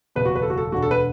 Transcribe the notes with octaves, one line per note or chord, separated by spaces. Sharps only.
F#1 E2 B2 B4
F#4
B4
A4
F#4
A4
E1 D2 D3 F#4
A4
B4